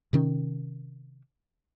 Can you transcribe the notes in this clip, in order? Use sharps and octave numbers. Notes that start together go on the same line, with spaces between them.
C3 D#3 C#4